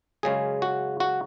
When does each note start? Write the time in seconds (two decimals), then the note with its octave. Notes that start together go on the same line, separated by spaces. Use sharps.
0.23 F#2 C#3 G#3 C#4 G#4
0.62 F#4
1.00 F#4